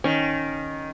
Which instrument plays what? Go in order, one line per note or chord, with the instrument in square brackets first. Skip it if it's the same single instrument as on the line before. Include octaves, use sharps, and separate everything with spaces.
[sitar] D#3 [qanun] C#4